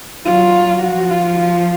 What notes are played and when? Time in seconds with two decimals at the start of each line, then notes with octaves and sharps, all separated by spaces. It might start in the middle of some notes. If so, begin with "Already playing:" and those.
0.24 F#3 F4
0.82 F3 F#4
1.10 F4
1.39 F4